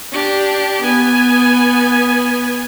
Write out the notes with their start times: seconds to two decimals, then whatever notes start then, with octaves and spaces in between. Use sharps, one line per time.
0.12 D4 G4
0.81 B3 G#5